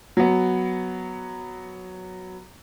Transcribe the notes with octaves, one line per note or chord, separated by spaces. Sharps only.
F#3 B3